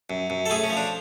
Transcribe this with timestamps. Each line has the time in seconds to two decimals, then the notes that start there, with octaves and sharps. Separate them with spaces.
0.10 F#2
0.30 F#2
0.46 A4
0.50 A3 G#4
0.64 C#4
0.70 F3
0.77 D4